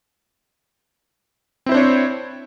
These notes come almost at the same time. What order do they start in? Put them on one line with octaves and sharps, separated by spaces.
C4 E4 C5 D4 C#5